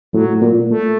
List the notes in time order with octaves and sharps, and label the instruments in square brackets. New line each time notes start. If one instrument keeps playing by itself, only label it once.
[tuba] A2 [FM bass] F#3
[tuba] A#2
[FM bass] A3